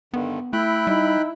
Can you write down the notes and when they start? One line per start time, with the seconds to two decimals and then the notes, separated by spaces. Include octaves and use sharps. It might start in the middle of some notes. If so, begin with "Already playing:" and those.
0.14 G2 D3 D#3 B3
0.53 A3 E4 G5 B5 F#6
0.87 G3 D#4